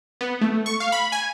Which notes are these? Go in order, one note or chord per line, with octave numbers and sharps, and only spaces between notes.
B3
A3
C#6
F5
B5
G#5